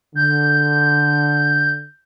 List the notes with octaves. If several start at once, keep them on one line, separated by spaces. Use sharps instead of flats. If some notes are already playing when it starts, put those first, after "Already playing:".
D3 G6